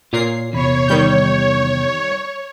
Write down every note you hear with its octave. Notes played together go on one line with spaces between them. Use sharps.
A#2 F4 A#4 C#5 C7
E2 C3 C#5 B5
D#3 G3 G6
C#5